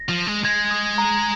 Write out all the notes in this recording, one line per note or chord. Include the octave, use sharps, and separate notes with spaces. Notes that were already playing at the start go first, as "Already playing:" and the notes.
Already playing: A#6
F3
G#3
G#3 G#6
D#6
A#5